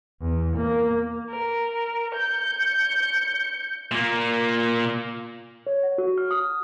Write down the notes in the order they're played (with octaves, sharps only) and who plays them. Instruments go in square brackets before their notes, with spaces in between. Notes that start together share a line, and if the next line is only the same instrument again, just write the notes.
[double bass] E2
A#3
[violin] A#4
G6 C#7
[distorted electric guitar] A#2 A#3
[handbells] C#5
F#5
F#4
F6
D#6